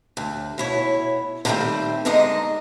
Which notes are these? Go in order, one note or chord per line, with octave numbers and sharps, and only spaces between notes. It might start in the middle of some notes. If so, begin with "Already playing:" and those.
D2
B2 E4 C#5
D3 D#3 F#3 G3 A3 C4
G#2 D3 G#3 D#4 D#5 A#5